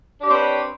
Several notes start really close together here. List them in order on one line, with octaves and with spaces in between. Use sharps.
D4 G4 C#5 C4 B4